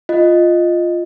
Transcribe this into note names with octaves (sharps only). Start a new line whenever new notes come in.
F4 D#5